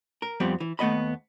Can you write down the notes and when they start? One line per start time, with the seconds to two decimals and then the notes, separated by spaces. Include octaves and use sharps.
0.22 A#4
0.40 F2 G3 B3 C4
0.60 E3
0.79 D#2 A3 B3 D#5 B5